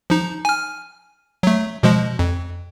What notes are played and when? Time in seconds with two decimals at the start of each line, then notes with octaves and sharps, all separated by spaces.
0.10 F3 D#4
0.45 G#5 F6
1.43 F#3 A3
1.83 B2 F3 G#3
2.19 F2